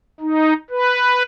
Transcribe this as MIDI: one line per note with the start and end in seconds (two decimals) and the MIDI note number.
0.20 0.53 63
0.70 1.23 71